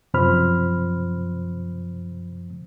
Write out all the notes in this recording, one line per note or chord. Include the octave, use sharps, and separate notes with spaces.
F#2 C3 F3 C5 B5 F6